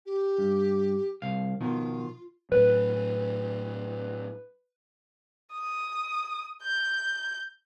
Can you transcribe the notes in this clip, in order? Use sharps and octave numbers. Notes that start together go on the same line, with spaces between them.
G4
G2
C2 F5
B2 D#3 F3 F4
A2 F#3 B4
D#6
G6